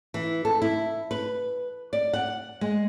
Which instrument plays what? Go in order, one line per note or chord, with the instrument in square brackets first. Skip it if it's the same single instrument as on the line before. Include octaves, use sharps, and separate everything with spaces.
[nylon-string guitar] E3
A4
E4
B4
D5
F#5
G#3